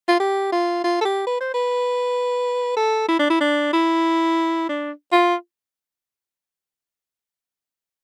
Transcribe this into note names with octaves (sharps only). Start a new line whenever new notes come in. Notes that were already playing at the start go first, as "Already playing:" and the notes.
F4
G4
F4
F4
A4
G4
B4
C5
B4
A4
E4
D4
E4
D4
E4
D4
F4